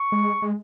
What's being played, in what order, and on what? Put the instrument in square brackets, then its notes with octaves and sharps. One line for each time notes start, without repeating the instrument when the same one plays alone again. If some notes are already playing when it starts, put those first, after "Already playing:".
Already playing: [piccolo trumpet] C#6
[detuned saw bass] G#3
G#3